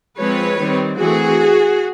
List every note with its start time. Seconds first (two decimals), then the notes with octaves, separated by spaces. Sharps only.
0.18 F3 G#3 C4 B4 C#5
0.58 D#3 G3 C4
0.99 E3 A3 C4 F#4 G#4